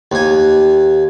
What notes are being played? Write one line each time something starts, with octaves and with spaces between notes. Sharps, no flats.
D#2 G#5